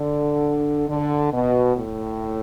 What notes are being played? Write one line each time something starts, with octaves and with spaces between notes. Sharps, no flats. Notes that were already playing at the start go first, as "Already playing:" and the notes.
Already playing: D3
D3
B2
A2